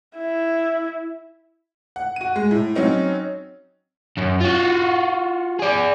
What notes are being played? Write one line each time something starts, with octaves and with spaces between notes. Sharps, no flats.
E4
F#5
F#4 D#7
G#3
A2
F#3 C4 C#4 D#4
F#2
F4 F#4
G#4 D5